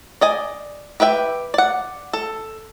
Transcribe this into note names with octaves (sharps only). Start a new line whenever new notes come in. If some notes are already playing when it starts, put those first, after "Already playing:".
D5 D#5 G#5
G4 B4 E5 G5
D5 F#5
A4